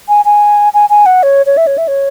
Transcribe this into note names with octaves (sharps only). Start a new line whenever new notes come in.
G#5
G#5
G#5
G#5
F#5
C#5
C#5
E5
C#5
E5
C#5